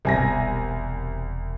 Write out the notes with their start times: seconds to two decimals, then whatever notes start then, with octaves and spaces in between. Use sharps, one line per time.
0.05 E1 C2 G#5 A#6